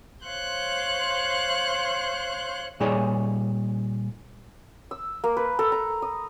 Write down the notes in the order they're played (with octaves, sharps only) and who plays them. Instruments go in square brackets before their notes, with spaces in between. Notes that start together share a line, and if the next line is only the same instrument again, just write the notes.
[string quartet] C5 C#5 F5 C6 F#6 G6
[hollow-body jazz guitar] A#2 G3 D#4 G#4 C#5 D5
[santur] E6
A#3
B4
A4
A#5
D#6